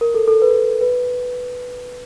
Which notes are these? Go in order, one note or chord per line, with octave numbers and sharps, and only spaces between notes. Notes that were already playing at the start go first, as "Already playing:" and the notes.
A#4
A4
A4
B4
B4